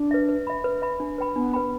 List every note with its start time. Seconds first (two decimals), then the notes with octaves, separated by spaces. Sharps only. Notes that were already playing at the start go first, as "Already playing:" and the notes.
Already playing: D4
0.11 B4 E5
0.29 B4
0.47 E5 B5
0.64 B4
0.82 E5 B5
1.00 D4
1.18 B4 G5 B5
1.36 B3 D4
1.53 B4 G5 B5